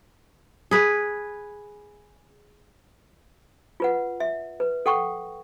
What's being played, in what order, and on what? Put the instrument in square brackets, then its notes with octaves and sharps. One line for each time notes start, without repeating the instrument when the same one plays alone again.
[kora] G#4 B4
[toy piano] F4 B4 F#5
E5
B4
A4 F#5 G5 C#6